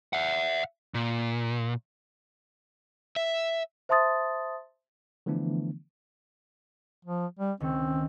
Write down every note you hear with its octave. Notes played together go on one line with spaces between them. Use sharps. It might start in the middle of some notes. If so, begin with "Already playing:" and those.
E5 F#5
A#2
E5
C5 E5 A5 C6 D#6 A6
D3 E3 F3 A3 B3 D4
F3
G3
C#2 D#3 C4